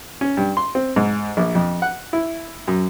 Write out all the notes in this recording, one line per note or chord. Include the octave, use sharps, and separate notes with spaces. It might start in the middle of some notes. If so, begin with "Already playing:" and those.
C#4
G2
C6
C4
G#2
A#1
F2
F#5
E4
F#2